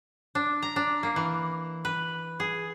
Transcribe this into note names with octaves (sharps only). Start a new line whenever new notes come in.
D4
A#5
D4
A#3
E3
B4
G#4